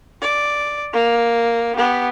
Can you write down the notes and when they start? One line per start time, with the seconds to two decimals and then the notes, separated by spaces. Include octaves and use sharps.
0.22 D5
0.93 A#3
1.76 B3 G4